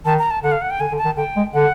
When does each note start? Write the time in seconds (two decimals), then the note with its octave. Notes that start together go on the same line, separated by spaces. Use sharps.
0.05 D#3 A5
0.19 A#5
0.31 A5
0.43 D3 F#5
0.52 F5
0.61 F#5
0.70 G5
0.80 D3 G#5
0.92 D3
0.98 A5
1.05 D#3
1.17 D3 G5
1.36 G#3
1.53 D3 F#5